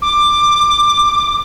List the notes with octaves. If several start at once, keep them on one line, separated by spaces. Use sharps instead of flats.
D6